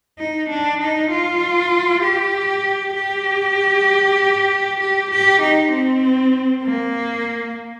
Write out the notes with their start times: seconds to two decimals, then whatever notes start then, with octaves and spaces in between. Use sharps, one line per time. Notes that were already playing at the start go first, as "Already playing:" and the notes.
0.19 D#4
0.49 D4
0.80 D#4
1.11 F4
2.03 G4
2.96 G4
4.80 G4
5.11 G4
5.42 D#4
5.73 C4
6.64 A#3